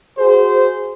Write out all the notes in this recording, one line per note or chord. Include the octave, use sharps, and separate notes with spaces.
F#4 G#4 C5